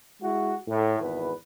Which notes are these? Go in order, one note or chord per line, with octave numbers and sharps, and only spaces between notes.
G#3 E4 F#4
A2
G#1 E2 B4